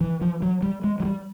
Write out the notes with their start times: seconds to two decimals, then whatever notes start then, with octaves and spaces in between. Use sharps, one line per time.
0.01 E3
0.21 F3
0.42 F#3
0.63 G3
0.84 G#3
1.00 F#3
1.05 G3